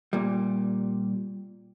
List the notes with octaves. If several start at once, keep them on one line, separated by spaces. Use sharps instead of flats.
A#2 G3